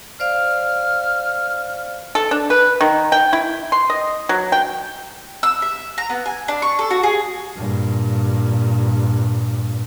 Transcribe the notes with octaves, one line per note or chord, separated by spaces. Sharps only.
C5 D5 F5 F6
A4
D4
B4
D#3
G5
E4
C6
D#5
F#3
G5
E6
E5
A#5
B3
G#5
D4
C#6
A4
F#4
G#4
G2 A#2